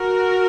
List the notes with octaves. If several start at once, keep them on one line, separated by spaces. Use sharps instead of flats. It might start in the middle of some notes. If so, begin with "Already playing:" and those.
Already playing: F#4 A#4